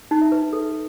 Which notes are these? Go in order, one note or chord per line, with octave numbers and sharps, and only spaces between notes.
D#4
E5
B4
D#4
A4